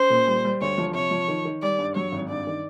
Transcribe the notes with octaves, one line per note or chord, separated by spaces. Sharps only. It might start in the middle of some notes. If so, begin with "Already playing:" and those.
Already playing: C#4 C5
A#2
G3
G3
D2 C#5
F3
C3 C#5
F3
D#3
D#3
G3 D5
G2
F#3 C#5
G#1
G2 D5
D#3